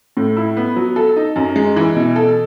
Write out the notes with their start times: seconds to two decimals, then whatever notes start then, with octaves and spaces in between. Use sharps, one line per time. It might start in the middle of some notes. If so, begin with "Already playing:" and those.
0.17 A2
0.37 E4
0.57 B3
0.76 F#3
0.96 A4
1.16 D#4
1.36 F#2
1.56 G#3
1.76 E3
1.96 B2
2.16 A4